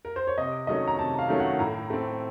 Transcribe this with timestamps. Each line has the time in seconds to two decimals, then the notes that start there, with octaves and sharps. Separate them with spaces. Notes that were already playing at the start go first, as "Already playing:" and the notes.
0.05 A#4
0.16 C5
0.27 C#5
0.38 C3 D#5
0.67 D#3 F#3 A3 C#4 D#5
0.88 A#5
0.99 C3 A5
1.19 F5
1.28 D#3 F#3 A3 C#4
1.40 F#5
1.59 A2 A#5
1.90 A3 C4